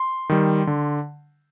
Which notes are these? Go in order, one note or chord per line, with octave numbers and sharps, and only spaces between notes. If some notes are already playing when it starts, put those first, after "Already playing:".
Already playing: C6
D#3 G3
D3